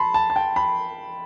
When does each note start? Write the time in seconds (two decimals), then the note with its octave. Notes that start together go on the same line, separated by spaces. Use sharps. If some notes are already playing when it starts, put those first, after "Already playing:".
Already playing: A5 B5 C6
0.14 A5
0.30 A5
0.36 G5
0.56 B5